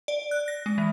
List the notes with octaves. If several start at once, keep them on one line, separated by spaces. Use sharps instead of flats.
D5
F#6
A#6
G#3
E3